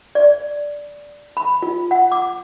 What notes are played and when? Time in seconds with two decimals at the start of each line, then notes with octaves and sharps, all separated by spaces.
0.15 D5
1.37 B5
1.63 F4
1.91 F#5
2.12 D6